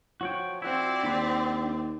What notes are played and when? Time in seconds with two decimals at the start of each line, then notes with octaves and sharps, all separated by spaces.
0.21 F3 F#4 C#5 G5
0.62 C4 E4 F#4 D5
1.03 D#2 D4 B5